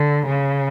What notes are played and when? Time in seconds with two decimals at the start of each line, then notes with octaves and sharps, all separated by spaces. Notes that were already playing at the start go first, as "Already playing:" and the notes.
Already playing: D3
0.27 C#3